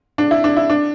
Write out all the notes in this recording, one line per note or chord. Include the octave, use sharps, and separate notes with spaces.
D4
E4
D4
E4
D4